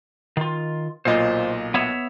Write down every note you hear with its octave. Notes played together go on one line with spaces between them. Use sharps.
D#3 F4
B1 A#2 F4 C5 D#5
B3 C#5 E5